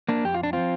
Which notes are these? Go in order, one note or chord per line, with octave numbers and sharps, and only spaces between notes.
A#3 D4
F2 G4
F4
D4
F3 C4 F4